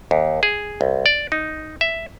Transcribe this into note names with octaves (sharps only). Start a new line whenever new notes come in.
D#2
G#4
C2
D5
D#4
E5